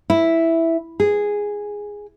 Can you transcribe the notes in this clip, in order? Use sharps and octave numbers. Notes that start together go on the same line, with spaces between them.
E4
G#4